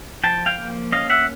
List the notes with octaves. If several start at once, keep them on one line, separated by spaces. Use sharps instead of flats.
F3 G5 A5
F5 G5
A#3
C#4 D#5 F5
E5 F#5